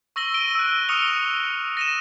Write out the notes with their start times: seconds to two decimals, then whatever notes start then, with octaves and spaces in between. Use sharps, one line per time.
0.16 C#6 E6 A#6 F#7 G7
0.34 D7 D#7 G7
0.55 E6 F#6
0.89 C#6 D#6 F6 C#7 F7 G7
1.77 A#6 D#7 E7